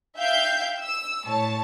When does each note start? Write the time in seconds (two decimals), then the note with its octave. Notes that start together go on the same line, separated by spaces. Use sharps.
0.17 E5 F5 G5 G6
0.79 E6
1.26 A2 C#5 A5